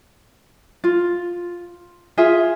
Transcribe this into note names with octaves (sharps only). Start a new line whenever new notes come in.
F4
F4 G#4 E5